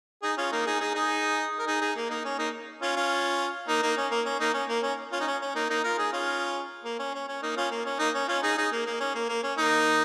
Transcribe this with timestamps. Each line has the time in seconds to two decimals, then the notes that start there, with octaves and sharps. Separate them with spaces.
0.23 D#4 G#4
0.37 C#4 F4
0.52 A#3 D#4
0.66 D#4 G#4
0.80 D#4 G#4
0.95 D#4 G#4
1.59 A#4
1.67 D#4 G#4
1.81 D#4 G#4
1.96 A#3
2.10 A#3 D#4
2.25 C#4
2.38 A#3 D#4
2.82 C#4 F4
2.97 C#4 F4
3.68 A#3 D#4
3.83 A#3 D#4
3.98 C#4
4.11 A#3
4.26 C#4
4.40 A#3 D#4
4.54 C#4
4.69 A#3
4.83 C#4
5.12 C#4 F4
5.21 D#4
5.27 C#4
5.41 C#4
5.55 A#3 D#4
5.70 A#3 D#4
5.84 F4 A#4
5.98 D#4 G#4
6.12 C#4 F4
6.84 A#3
6.99 C#4
7.14 C#4
7.28 C#4
7.42 A#3 D#4
7.57 C#4 F4
7.71 A#3
7.86 C#4
8.00 A#3 D#4
8.15 C#4
8.28 C#4 F4
8.43 D#4 G#4
8.57 D#4 G#4
8.72 A#3
8.87 A#3
9.00 C#4
9.15 A#3
9.29 A#3
9.43 C#4
9.58 A#3 D#4